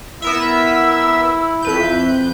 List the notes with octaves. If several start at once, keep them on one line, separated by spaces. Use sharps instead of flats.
B3 E4 A#4 E5 E6
F2 B4 E5 G6